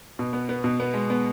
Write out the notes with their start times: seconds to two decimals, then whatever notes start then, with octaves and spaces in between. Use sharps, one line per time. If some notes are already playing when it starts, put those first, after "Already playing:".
0.19 B2
0.33 B3
0.49 B3
0.64 B2
0.80 B3
0.94 G#3
1.10 B3